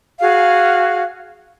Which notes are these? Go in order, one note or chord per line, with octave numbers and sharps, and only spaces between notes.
F#4 G#4 F5